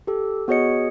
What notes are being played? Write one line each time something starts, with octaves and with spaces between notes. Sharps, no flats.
G4 A4
B3 F#4 G#4 C#5 D#5 C#7